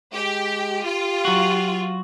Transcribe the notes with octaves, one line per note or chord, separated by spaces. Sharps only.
G#3 G4
F4 G4
F#3 F#4